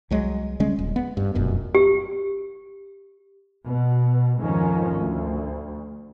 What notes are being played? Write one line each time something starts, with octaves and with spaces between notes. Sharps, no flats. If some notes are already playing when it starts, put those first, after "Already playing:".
C2 F#3 G#3
C#3 G3 G#3 C#4
D#1
B3
G2
F1 A#1 F#2 B2
G4
B2
F2 G#2 D#3 F3 C#4
D2